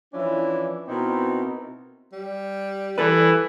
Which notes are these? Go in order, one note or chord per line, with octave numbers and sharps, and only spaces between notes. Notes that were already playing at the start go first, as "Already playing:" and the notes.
E3 F3 C#4 D4 E4
B2 C4 D#4 E4 A#4
G3
E3 A4 B4